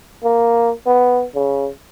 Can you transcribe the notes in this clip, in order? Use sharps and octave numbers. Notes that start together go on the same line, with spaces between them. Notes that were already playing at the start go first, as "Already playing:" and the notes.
A#3
B3
C#3